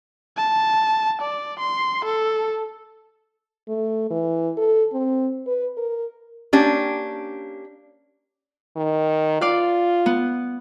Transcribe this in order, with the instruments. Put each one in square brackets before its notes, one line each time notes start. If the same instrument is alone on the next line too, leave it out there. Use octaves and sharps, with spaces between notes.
[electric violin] A5
D5
C6
A4
[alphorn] A3
E3
A4
C4
B4
A#4
[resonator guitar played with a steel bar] A#3 C#4 D4 G4
[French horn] D#3
[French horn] F4 [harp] D5 F5
[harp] B3